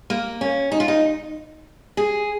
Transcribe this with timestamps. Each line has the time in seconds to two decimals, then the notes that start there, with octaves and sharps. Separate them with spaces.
0.10 A#3
0.41 C#4
0.72 D#4
0.80 F4
0.88 D#4
1.97 G#4